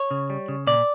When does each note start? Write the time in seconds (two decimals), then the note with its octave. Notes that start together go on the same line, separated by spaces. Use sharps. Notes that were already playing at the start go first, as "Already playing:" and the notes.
Already playing: C#5
0.11 C#3
0.30 G3
0.48 C#3
0.67 A#2 D5